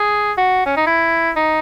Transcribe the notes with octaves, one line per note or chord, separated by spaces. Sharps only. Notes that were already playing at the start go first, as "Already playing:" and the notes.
Already playing: G#4
F#4
C#4
D#4
E4
D#4